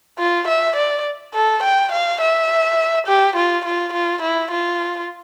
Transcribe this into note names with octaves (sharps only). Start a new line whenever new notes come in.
F4
E5
D5
A4
G5
F5
E5
G4
F4
F4
F4
E4
F4